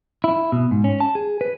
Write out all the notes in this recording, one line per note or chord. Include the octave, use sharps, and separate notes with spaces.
E4
B2
G#2
C#4
A5
G#4
B4